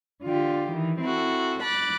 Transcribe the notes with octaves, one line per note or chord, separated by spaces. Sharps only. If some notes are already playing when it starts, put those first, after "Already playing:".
D3 F4 G4
D#3 E3
C4 E4 F#4 A4
B5 D6 F#6 A6